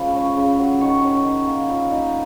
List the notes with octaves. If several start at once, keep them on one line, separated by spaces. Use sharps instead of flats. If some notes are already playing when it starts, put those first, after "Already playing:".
Already playing: C#3 F3 G#3 B5
C#4
C#3
F#3
D#3 C#6
C#4
D#3
A#3
A#2 B5
D#4